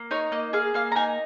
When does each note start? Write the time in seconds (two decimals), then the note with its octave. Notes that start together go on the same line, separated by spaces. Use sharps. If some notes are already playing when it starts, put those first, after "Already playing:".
Already playing: A#3
0.11 D#4 C#5
0.32 A#3 D#5
0.53 G#4 F5
0.74 A#3 F5
0.92 A#5
0.95 D#4 G#5